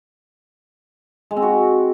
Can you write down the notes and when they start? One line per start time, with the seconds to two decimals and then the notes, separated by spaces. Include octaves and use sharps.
1.31 G#3
1.36 C4
1.42 F#4